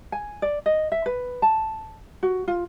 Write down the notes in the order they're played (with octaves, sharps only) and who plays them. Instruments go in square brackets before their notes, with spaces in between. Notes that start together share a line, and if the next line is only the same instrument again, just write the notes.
[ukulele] G#5
D5
D#5
E5
B4
A5
F#4
F4